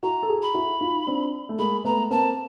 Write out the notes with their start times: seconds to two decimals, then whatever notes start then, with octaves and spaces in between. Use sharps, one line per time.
0.03 E4 F#4 A#5
0.23 A4
0.29 F#4 G#4
0.42 B5
0.54 E4 F#4
0.81 D#4 F4
1.07 C4 D4
1.49 A3
1.58 G#3 A#3 B5
1.84 A3 B3 A#5
2.10 A#3 C4 A5